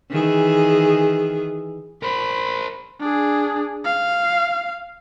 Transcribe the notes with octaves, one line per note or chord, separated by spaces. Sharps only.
D#3 E3 G#4
A#4 C5 B5
D4 G#4
F5